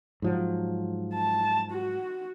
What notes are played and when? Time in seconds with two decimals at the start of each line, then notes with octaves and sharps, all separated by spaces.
0.22 G#2 F3 F#3
1.14 A5
1.72 F#4